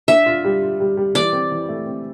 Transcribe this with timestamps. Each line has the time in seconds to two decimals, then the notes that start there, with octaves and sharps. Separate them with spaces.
0.08 D4 E5
0.26 F4
0.44 G3
0.62 F4
0.80 G3
0.97 G3
1.15 E3 D5
1.33 C4
1.51 E3
1.69 A3
1.86 C4